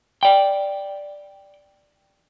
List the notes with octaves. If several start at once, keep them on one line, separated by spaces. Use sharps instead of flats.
D5 G5